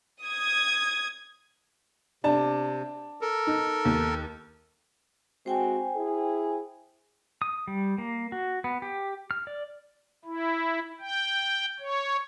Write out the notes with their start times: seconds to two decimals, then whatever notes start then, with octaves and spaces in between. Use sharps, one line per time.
0.23 D#6 G#6
2.24 C3 D4 A5
3.21 A4 A#4
3.47 D#4
3.85 D#2
5.46 G#3 C4 F#4 C5 G5 G#5
5.95 E4 G#4
7.42 D#6
7.68 G3
7.98 A#3
8.32 F#4
8.64 B3
8.82 G4
9.31 F6
9.47 D5
10.25 E4
11.00 G5
11.80 C#5